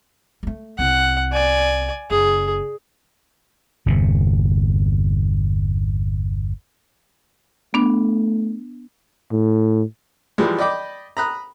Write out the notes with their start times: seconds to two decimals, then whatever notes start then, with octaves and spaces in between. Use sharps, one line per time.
0.43 G#3 A3
0.79 C2 F#5
1.32 D5 G#5
2.10 F#1 G#4
3.86 G1 E2 C3
7.74 A3 B3 D4
9.32 A2
10.38 E3 F3 G3 G#3
10.59 D5 D#5 G5 B5 D6
11.17 A#5 B5 D#6 F#6